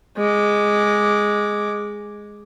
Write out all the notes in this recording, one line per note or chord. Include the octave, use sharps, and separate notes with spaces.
G#3 D6